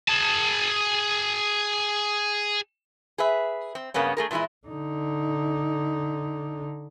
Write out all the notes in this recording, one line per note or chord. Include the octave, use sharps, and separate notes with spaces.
G#4 A5
G#4 B4 E5
C4
G2 C#3 A#3 B3 C#4
A3 G#4 A#4
A#2 E3 G3 G#3 E4
D3 D#4